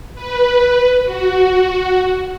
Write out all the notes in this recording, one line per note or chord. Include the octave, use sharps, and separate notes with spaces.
B4
F#4